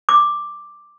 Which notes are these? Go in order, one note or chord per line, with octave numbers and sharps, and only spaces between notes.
D6